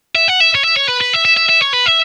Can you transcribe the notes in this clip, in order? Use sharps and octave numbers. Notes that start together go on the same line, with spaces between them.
E5
F#5
E5
C#5
E5
C#5
B4
B4
E5
E5
E5
E5
C#5
B4
E5